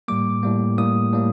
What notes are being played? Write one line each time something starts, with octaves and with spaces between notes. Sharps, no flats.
A2 G3 A#3 D6
A2 G3 A#3
A2 G3 A#3 D#6
A2 G3 A#3